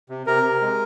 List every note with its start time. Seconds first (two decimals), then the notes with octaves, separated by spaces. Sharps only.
0.09 C3
0.27 C3 A#4
0.43 C3
0.61 G#3